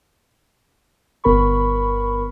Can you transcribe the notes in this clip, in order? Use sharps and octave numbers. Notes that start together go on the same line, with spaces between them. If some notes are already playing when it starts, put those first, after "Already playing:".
G1 B3 A#4 B5 C#6